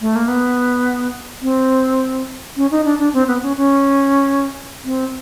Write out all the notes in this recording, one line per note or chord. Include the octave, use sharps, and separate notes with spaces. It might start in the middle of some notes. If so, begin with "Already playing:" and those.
A3
A#3
B3
C4
C#4
D#4
D4
D4
C4
B3
C#4
C#4
C4